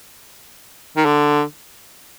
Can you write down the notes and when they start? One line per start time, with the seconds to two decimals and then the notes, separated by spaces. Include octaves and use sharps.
0.97 D#3
1.05 D3